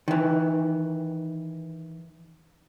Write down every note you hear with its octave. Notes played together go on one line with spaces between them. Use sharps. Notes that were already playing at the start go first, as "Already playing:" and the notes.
D#3 E3